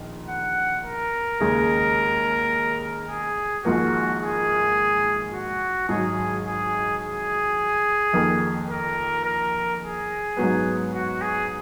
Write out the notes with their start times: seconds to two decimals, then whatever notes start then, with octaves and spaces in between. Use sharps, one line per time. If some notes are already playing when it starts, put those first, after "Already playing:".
Already playing: A#1 D#3
0.29 F#5
0.84 A#4
1.40 D#2 C#3 G#3
3.08 G#4
3.64 G#1 G#2 F3 A#3 F#4
4.21 G#4
5.33 F#4
5.88 G#1 G#2 F#3 G#4
6.45 G#4
7.01 G#4
8.13 F2 D#3 A#3
8.69 A#4
9.25 A#4
9.81 G#4
10.37 G#2 F#3 B3
10.93 F#4
11.21 G#4